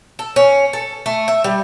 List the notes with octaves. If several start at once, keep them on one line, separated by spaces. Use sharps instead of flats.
A4
C#4
A4
A3
E5
G3